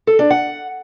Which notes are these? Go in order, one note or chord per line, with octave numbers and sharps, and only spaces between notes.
A4
D4
F#5